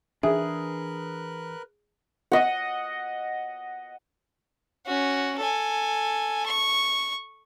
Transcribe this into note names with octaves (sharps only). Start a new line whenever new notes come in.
E3 D4 G#4 A#4 B4 E5 F#6
D#5 F#5
C#4 F#4
A4 G#5
C#6